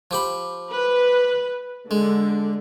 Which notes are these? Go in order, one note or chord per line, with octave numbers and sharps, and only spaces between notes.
F3 G4 B5
B4
D3 G#3